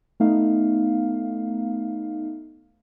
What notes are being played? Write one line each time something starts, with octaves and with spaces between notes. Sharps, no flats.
A3 B3 D#4 F5